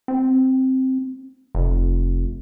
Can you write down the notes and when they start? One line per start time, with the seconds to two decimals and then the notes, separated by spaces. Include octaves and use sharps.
0.08 C4
1.55 F1